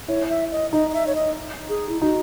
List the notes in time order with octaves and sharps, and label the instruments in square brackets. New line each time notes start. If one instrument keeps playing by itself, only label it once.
[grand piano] E4 [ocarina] C#5
[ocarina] E5
D#5
[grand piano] D#4 [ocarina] D#5
[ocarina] D#5
E5
C#5
D#5
G#4
E4
[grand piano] D#4 [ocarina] F#4